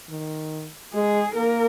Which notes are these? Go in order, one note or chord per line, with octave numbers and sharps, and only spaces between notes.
D#3
G#3 G#4
A#3 A#4